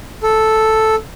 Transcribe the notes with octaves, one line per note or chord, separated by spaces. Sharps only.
A4